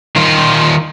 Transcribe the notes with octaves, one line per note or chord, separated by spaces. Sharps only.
D#3 F4